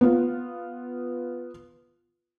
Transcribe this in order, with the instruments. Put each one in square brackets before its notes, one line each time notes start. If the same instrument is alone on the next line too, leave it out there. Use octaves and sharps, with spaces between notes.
[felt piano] B3 F4